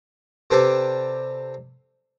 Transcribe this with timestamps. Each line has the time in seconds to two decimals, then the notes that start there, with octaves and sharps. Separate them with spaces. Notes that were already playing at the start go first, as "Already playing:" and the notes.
0.51 C3 C4 D4 G4 A4 B4